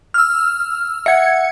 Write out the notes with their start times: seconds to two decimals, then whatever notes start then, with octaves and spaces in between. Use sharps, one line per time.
0.14 E6 F6
1.06 E5 F#5 G#6 C#7